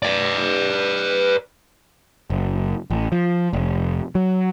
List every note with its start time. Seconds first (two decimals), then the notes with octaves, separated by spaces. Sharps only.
0.03 B4 D5
2.30 F#1
2.90 A1
3.12 F3
3.53 F1
4.15 F#3